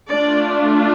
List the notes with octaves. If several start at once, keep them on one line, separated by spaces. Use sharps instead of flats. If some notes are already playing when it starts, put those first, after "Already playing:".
A3 D4 F4 D5